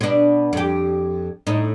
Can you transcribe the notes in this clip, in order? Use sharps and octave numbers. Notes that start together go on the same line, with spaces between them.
B2 D4
F2 G4
A2 D#4